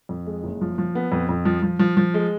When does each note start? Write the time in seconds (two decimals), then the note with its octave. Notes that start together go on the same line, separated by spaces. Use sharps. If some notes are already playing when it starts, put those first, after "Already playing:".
0.09 F2
0.26 G#3
0.43 F#1
0.61 F3
0.78 F3
0.95 B3
1.12 F2
1.29 F2
1.45 F3
1.63 F3
1.79 F3
1.97 F3
2.14 G#3